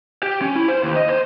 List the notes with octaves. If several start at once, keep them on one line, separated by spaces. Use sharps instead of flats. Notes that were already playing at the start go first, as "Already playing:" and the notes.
G4
C#4
E4
C5
D#2
D#5
C5